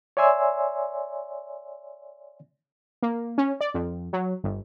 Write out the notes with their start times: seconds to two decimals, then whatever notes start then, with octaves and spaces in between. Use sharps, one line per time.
0.17 C#5 D5 E5 G#5 C6 E6
3.03 A#3
3.38 C#4
3.61 D5
3.74 F2
4.13 F#3
4.44 G1